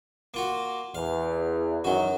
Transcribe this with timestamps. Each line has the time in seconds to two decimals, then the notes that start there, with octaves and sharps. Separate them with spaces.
0.34 A#3 F4 F#4
0.95 E2 F5
1.84 F#2 D#3 E3 F#3 F#4